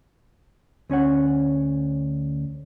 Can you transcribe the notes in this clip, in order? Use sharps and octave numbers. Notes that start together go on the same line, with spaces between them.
D2 C#4 C#5 F#5